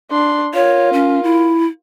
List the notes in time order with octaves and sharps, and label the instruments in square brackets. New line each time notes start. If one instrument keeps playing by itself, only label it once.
[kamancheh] D4 C6
[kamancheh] F4 A#4 [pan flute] C#5
[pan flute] C#4
E4